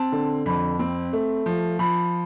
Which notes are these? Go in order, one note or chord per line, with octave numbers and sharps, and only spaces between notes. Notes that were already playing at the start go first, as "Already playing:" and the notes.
Already playing: C4 A5
D3
F2 B5
C4
A3
F3
F3 B5